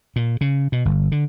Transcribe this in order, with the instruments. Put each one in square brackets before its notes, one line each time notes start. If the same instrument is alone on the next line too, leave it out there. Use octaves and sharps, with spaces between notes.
[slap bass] A#2
C#3
B2
G1
D3